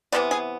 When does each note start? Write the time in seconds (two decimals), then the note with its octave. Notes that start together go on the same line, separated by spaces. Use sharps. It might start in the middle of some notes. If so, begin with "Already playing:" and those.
0.12 C3 E3 G#3 B3 D5
0.31 G#4